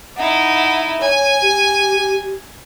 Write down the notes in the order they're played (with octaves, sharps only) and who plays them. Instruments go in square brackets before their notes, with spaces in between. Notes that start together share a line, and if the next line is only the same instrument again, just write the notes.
[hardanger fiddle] D#4 E4 [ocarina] F#5
[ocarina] C#5 [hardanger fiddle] G#5
[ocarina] G4